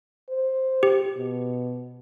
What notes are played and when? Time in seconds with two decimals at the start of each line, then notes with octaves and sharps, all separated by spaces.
0.30 C5
0.83 G4
1.17 B2